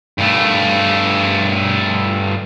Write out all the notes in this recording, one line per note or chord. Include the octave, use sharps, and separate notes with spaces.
G2 A3